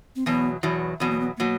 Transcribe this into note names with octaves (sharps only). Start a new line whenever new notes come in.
C4
E2 B2 F#3 B3
E2 B2 F#3
E2 B2 F#3 B3
A#3
B3
B2 F#3 A#3